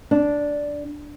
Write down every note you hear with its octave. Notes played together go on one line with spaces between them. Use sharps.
D4